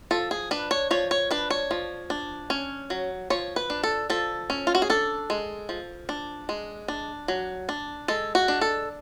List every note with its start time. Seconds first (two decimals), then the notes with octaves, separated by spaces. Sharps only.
0.11 F3 A4
0.31 G#4
0.51 D4 B4
0.71 C#5
0.91 F3 C#5
1.11 C#5
1.31 D4 B4
1.50 C#5
1.71 F3
2.10 D4
2.50 C#4
2.90 F#3
3.30 F3 C#5
3.56 B4
3.70 D4
3.83 A4
4.10 F3 A4
4.50 C#4
4.67 F4
4.75 F#4
4.82 G#4
4.90 D4 A4
5.30 G#3
5.69 F3
6.09 D4
6.49 G#3
6.88 D4
7.28 F#3
7.69 D4
8.08 G#3 A4
8.35 F#4
8.48 D4
8.61 A4